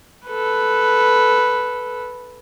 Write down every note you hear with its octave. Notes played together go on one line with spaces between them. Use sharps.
A4 B4